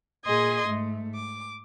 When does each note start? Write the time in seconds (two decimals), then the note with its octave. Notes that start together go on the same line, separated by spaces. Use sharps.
0.25 A#2 G#4 D#5 C6 G#6
0.67 G#2 A3
1.15 D6